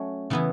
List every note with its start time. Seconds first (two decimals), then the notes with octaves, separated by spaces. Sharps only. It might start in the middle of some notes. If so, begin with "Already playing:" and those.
Already playing: F#3 A3 C#4
0.30 C#3 E3 B3 E4